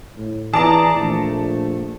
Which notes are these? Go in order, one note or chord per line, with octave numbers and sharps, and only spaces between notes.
A2
E3 G#4 D5 A5 A#5
A#1 A3